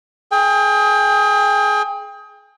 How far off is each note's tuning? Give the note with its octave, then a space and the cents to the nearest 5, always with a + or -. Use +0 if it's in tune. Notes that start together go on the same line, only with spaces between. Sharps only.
G#4 +20 G5 +35